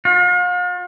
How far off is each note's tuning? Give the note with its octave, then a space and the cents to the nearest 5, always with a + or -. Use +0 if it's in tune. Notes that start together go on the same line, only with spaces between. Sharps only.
F4 +45